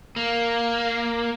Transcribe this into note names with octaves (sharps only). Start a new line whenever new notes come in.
A#3